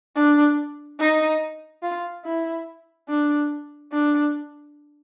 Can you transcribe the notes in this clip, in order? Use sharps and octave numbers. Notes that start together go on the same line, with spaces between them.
D4
D#4
F4
E4
D4
D4